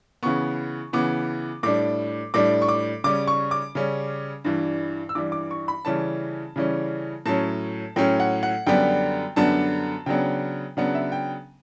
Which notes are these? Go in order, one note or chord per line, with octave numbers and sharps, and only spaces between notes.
C#3 E3 B3 C#6
C#3 E3 B3 D6
A2 G3 D4 D6
A2 G3 D4 D6
C#6
D6
C#3 G3 C#4 D6
C#6
D6
C#3 G3 C#4
G2 E3 G3
E6
G2 E3 G3 D6
D6
C#6
B5
C#3 E3 G3 C#4 A5
C#3 E3 G3 C#4
A2 F#3 C#4 A5
A2 F#3 C#4 G5
F#5
F#5
F#2 D3 G3 B3 D4 G5
F#2 D3 G3 B3 D4 A5
C#3 F#3 B3 D4 G5
C#3 F#3 B3 D4 F#5
E5
G5